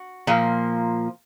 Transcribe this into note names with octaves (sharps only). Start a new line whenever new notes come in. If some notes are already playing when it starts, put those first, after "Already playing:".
Already playing: F#4
A#2 F3 A#3